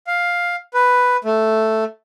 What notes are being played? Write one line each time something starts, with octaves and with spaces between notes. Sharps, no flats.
F5
B4
A3